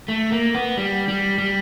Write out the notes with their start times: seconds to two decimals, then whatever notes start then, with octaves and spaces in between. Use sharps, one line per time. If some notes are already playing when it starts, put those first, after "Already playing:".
0.08 A3
0.32 A#3
0.55 B3
0.77 G3
1.08 G3
1.38 G3